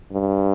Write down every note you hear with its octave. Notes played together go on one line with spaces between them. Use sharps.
G2